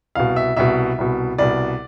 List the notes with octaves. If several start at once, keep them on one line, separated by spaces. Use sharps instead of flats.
C2 B2 F5
E5
C2 B2 E5
C2 B2
C2 B2 D5